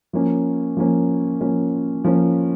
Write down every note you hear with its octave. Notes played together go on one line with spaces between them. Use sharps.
F3 A#3 C#4
F3 A#3 C#4
F3 A#3 C#4
F3 A#3 C#4